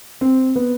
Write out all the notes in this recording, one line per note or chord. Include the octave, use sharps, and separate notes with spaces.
C4
B3